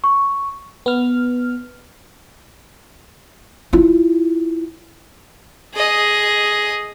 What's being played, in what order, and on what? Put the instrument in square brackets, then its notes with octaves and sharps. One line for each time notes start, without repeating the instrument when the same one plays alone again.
[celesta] C#6
[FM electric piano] B3 F6
[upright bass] E4 F4
[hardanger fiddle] G#4 D#5